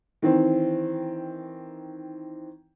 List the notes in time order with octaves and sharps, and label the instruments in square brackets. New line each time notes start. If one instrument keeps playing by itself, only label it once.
[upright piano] D#3 E3 C4